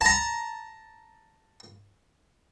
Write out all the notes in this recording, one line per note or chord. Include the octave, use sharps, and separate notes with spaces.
A5 A#5